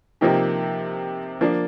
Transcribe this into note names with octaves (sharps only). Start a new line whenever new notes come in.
C3 F3 A#3 D#4 G4
F3 A#3 D4